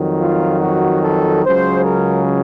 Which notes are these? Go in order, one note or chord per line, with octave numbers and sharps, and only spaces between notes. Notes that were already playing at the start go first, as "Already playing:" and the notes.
Already playing: F2 D#3 F#3
F4
F#4
A4
C#2 C#3 F#3 C5
A#4